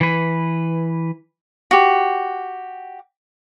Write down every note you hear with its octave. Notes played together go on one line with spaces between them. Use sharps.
E3 B4
F#4 G4